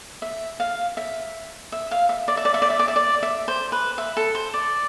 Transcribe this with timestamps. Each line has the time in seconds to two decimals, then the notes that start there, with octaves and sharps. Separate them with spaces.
0.22 E5
0.60 F5
0.97 E5
1.72 E5
1.91 F5
2.09 E5
2.28 D5
2.37 E5
2.45 D5
2.54 E5
2.62 D5
2.70 E5
2.79 D5
2.88 E5
2.96 D5
3.23 E5
3.48 C5
3.72 B4
3.98 E5
4.17 A4
4.35 C5
4.54 D5